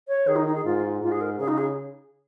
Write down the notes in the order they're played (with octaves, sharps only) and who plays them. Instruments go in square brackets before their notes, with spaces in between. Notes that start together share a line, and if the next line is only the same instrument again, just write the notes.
[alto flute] C#5
[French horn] D#3 [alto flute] G#4
[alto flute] D#4
D#4
G#4
[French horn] G#2 [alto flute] F4
[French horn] G#2 [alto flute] F4
[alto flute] G#4
A#4
[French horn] C#3 [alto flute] G#4
[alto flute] D#4
G#4